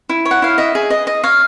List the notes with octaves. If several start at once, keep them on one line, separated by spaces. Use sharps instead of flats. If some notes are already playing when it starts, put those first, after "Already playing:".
E4
C#5
F#5
E4 F5
D#5 E5
G#4
D#5
D#5
C#5 F5